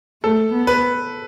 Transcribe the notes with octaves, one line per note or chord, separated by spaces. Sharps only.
A3 A4
B3
B4